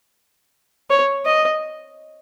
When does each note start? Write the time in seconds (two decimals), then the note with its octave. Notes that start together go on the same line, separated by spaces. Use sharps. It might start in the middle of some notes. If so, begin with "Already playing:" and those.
0.90 C#5
1.25 D#5